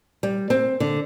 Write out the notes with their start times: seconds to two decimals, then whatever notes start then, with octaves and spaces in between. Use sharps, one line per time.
0.23 G3
0.50 C4
0.80 D3